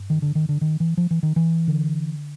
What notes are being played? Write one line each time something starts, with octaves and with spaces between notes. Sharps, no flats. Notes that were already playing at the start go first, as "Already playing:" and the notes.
Already playing: G2
D#3
D3
D#3
D3
D#3
E3
F3
E3
D#3
E3
D3